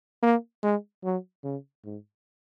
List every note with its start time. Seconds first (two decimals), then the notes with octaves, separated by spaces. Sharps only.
0.23 A#3
0.63 G#3
1.04 F#3
1.44 C#3
1.84 G#2